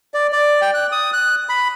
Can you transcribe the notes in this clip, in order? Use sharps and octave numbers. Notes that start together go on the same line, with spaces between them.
D5
D5
G5
F#6
D#6
F#6
B5